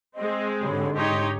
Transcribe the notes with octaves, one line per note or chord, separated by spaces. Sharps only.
G#3 C4 D#5
G#2 D3 G4 C#5 B5
D#4 G4 C#5 D#5 C6